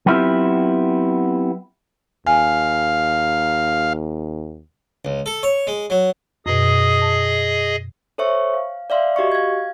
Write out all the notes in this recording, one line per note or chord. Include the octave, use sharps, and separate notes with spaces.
F#3 B3 C4 E4 F4 G4
D#2 F5 G#5
C#2
A4
C#5
G#3
F#3
F#2 B2 G#4 D#5 D#6
A5
A4 C5 C#5 E5 C#6
F5
D5 E5 F5 C6
F#4 G4 D#5 C#6
F5 G#6